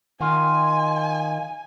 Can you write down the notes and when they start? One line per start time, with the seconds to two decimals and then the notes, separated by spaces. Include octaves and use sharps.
0.21 D#3 F4 G#5